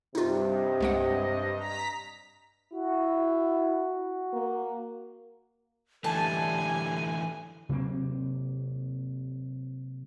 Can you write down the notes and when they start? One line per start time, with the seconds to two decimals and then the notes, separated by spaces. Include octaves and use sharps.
0.15 G2 C3 D#4 F4
0.49 D#5
0.80 C2 G#3 F#5
1.56 A#5 B6
2.72 E4 F#4
4.33 A#3
6.04 D3 E3 G3 A3 A4 G#5 A5
7.69 C3 F#3 A#3 C4